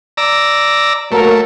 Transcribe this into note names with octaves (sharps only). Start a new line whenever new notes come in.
D5 A#5 E6
F#3 A3 A#3 A#4